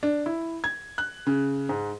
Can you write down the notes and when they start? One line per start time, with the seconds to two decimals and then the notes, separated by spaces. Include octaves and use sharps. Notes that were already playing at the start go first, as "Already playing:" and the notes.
0.03 D4
0.26 E4
0.64 G#6
0.98 F#6
1.27 C#3
1.69 G#2